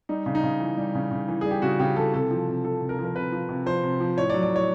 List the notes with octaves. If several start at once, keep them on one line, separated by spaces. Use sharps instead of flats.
G3 D#4
C#3
D#4
C#3
E3
G3
C#3
C#3
E3
G3 G#4
G4
C#3 F#4
C#3 G4
E3 A4
C3 A4
F3
C3
F3 A4
C3
A#4
F3
A#4
C3 B4
F3
C3
F3 C5
C3
F3
A2 C#5
D5
F#3
D5
A2
C#5